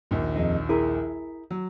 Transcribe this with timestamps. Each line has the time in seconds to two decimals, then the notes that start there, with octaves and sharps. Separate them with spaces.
0.11 A#1 D#2
0.36 F2 G#3 D#4
0.69 E4 G#4 A#4
1.51 F#3